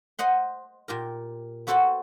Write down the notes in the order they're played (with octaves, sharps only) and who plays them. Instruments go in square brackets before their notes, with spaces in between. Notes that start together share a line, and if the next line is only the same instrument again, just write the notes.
[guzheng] C5 D#5 F#5 C6
A#2 G4 A#4
B3 F#4 A4 C5 F#5 G5